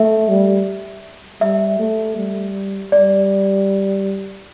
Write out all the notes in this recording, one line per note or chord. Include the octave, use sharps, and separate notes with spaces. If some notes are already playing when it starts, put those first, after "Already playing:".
Already playing: A3 E5
G3
G3 E5
A3
G3
G3 D5